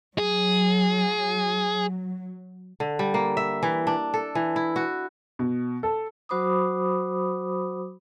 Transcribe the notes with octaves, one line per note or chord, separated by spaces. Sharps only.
F#3 G#4
D3
G3
A#3
E5
E3
D4
A4
E3
E4
F#4
B2
A4
F#3 F#4 C5 B5 D6 D#6